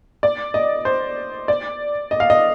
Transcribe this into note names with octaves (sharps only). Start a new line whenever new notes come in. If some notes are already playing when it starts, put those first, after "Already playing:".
D5
D#5
C5
D5
D#5
F5
D#5